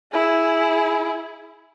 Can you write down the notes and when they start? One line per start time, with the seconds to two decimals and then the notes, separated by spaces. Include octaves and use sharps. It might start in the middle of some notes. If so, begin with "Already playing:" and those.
0.12 E4 G#4